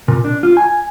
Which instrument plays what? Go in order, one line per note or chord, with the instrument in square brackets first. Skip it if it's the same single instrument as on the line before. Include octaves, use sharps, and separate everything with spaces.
[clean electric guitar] A#2
D4
F4
G#5